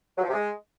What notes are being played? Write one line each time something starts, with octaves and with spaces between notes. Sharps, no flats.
F#3
F3
C3
G#3